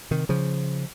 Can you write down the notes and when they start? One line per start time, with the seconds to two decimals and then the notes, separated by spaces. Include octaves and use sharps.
0.11 C3 D#3
0.29 C#3 F3